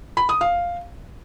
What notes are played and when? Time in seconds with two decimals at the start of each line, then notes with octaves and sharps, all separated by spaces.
0.17 B5
0.29 D#6
0.41 F5